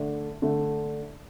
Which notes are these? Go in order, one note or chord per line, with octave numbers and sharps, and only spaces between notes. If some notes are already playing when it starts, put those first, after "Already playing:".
Already playing: D3 A3 D4
D3 A3 D4